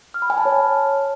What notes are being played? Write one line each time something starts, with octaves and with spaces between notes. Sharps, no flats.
F6
B5
G#5
A5
C#5